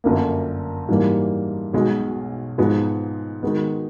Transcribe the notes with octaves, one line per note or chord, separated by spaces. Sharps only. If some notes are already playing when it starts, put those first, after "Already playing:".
G1 F#2 D3 F3 A#3
G#2 E3 G3 A#3
B1 B2 G#3
G#2 F3 G#3 B3
D#3 G#3 B3